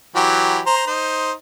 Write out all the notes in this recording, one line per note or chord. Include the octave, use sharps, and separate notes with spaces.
E3 F#3 G4
C5 A#5
D#4 C5